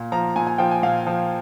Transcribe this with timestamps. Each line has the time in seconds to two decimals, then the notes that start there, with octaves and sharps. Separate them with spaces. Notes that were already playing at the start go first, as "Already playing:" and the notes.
Already playing: A#2
0.12 F3 A#5
0.36 A#2 G#5
0.47 G#5
0.58 F3 G5
0.71 G#5
0.82 A#2 F5
1.07 F3